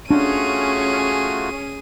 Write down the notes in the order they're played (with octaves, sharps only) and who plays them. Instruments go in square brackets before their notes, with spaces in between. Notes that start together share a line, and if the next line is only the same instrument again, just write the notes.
[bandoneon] A3 F4 F#4 [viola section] C#4 [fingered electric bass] D4 [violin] G#4 D#7